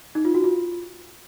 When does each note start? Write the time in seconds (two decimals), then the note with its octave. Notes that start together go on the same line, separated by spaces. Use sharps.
0.15 D#4
0.25 F4
0.34 F#4
0.44 F4